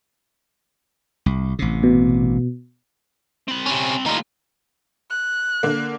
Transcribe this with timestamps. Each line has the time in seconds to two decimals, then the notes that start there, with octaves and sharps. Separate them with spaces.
1.26 C2
1.59 A1 C3
1.83 B2
3.48 C4 B5
3.66 C3 C#4
4.06 D#2 A2 D#4 F4
5.10 F#6
5.63 D3 A#3